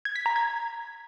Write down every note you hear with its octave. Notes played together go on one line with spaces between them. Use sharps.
G#6
B6
A#5
G#6